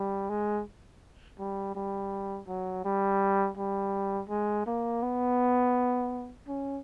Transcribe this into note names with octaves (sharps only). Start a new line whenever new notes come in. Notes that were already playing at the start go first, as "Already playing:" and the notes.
Already playing: G3
G#3
G3
G3
F#3
G3
G3
G#3
A#3
B3
C#4